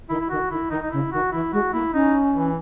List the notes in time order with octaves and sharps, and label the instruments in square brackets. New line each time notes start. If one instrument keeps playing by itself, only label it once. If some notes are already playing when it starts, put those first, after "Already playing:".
[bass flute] D#3 [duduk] E4
[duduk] E4
[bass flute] D#3 [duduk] F#4
[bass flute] D#3 [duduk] E4
[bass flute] D#3 [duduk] D#4
[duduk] D#4
[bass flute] C#3 [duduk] E4
[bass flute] D#3 [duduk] F#4
[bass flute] E3 [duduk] E4
[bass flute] G#3 [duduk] F#4
[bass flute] A#3 [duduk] E4
[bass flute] C#4 [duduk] D#4
[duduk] E3